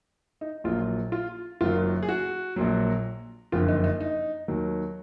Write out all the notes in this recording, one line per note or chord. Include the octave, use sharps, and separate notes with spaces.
D#4
A#1 A#2 F#3 F4
F4
F#1 F#2 D#3 F#3 F4
G#4
F#4
A#1 A#2 F#3
F#1 F2 D3 F4
D#4
D#4
D#4
D#2 D#3 F#3